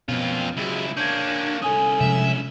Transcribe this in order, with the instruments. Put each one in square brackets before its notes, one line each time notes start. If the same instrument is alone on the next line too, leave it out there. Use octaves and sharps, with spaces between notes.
[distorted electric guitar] F2 F4 [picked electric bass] B2 [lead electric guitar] B3 C#4
[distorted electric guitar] C#2 E4 [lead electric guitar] F#3 G#3
[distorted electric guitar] A#3 C#4 [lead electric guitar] D4 [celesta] G6 G#6
[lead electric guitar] C2 C#4 [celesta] A4 G#5 D#6
[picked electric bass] C3 F3 G#3 [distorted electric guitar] E5